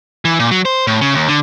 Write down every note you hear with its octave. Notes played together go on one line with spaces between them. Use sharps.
E3
A#2
F#3
C5
A2
C#3
D#2
D3